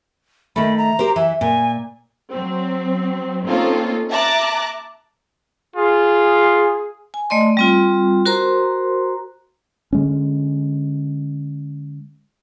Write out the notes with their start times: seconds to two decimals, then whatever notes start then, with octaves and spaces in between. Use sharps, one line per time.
0.56 D#3 A3 B5
0.78 A#5
0.99 G4 A#4 C5
1.16 E3 E5
1.41 A#2 G#5
2.32 F#3 C4
3.46 A#3 C4 C#4 D#4 F4 A4
4.10 E5 A5 A#5 D6 F#6
5.76 F4 G#4
7.14 G#5
7.30 A3 D5 D#5 C6
7.57 G3 C4 F4
8.26 F#4 A#4 C5 A#5 C6
9.93 D3 G#3 C#4